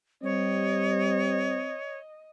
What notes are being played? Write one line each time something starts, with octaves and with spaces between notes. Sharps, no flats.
G3 C4 C#5 D#5